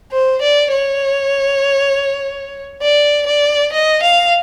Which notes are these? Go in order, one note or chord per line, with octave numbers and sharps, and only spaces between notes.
C5
D5
C#5
D5
D5
D#5
F5